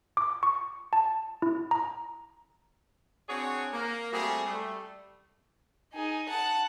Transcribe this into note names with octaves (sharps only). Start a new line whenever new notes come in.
D6
C#6
A5
E4
A#5
C4 D4 F#4 G#4 C#5 F#5
A#3
G3 A3 C4 F#4 G#4
G3 A3
D#4 G#4
F#5 A5